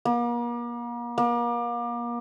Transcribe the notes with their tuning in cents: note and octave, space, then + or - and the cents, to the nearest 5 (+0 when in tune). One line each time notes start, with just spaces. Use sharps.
A#3 +40
A#3 +35